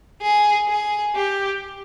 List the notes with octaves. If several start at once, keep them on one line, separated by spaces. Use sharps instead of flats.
G#4
G#4
G4